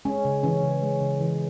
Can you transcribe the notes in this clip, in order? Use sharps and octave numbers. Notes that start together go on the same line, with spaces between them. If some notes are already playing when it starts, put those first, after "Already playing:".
G#3 C#4
C#3
E3 C#4
C#3
G#3
C#3
E3